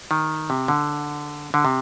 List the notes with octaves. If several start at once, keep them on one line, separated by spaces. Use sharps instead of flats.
D#3
C3
D3
D3
C3